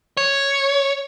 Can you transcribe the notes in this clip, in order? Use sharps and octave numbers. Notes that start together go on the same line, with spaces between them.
C#5